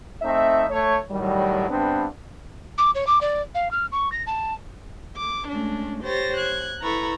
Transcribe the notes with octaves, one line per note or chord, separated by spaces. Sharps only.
A3 C4 D#4 E5
A3 C#5
A2 D#3 F#3 G3
G2 B3 C4 D4
D6
C#5
D6
D5
F5
F6
C#6
A#6
A5
D6
G#3 A3 C#4 D4
G4 C5 C#5 A6 A#6
F#6 G#6
E4 A4 B4 A#5 B5 C#6